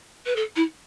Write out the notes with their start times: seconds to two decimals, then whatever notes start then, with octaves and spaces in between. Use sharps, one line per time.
0.26 B4
0.35 A4
0.55 E4